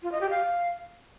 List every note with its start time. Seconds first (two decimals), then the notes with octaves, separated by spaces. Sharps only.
0.03 F4
0.12 D#5
0.21 G4
0.30 F5